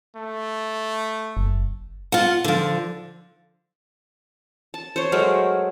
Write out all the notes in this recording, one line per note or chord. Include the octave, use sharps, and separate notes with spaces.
A3
F#1
F4 F#5
D3 F3
A5
C5 C#5
F#3 G#3 A3 A#4